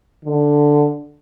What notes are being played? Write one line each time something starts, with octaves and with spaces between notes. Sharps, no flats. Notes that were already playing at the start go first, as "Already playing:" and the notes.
D3